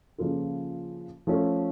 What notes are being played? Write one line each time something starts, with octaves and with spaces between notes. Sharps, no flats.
C#3 F3 A#3 F4 A4
F3 A3 C#4 A4